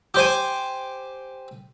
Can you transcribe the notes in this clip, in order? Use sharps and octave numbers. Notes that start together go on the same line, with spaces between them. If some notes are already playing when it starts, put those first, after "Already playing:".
G4 C5 G#5